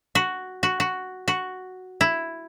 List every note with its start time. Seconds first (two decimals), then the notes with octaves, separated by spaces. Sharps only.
0.15 F#4
0.63 F#4
0.80 F#4
1.28 F#4
2.01 E4